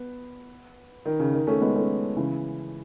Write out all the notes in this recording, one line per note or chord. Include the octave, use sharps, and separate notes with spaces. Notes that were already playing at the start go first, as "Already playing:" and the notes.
Already playing: B3
D#3
C#3
D#3
A3 C#4
G#3 B3
A3 C#4
C#3 E3